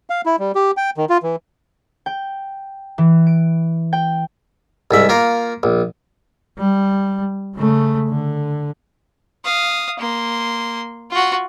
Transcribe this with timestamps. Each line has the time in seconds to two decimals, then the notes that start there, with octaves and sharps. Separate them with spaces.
0.10 F5
0.26 E4
0.39 G3
0.55 G4
0.77 G5
0.97 D#3
1.09 F4
1.23 E3
2.06 G5
2.98 E3
3.27 D7
3.93 G5
4.91 C2 G#2 E5
5.09 A#3 F4 A#4
5.63 A#1
6.59 G3
7.56 C#3 A3
8.09 D3
9.45 F5 D#6
9.99 A#3 C6
11.11 F4 F#4